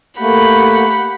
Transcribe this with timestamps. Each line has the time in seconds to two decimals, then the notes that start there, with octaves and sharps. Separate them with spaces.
0.20 A3 A#3 G4 F#5 B5